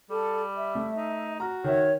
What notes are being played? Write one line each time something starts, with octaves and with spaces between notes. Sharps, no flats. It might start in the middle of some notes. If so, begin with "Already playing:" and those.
G3 A4
E5
A3
D#4
F#4 A#5 F6
D#3 C#5 E5